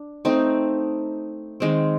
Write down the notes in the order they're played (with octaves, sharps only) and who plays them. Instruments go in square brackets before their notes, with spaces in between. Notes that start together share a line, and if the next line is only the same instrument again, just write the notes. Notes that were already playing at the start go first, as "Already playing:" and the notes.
Already playing: [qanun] D4
A3 C4 D#4
D#3 G#3 C4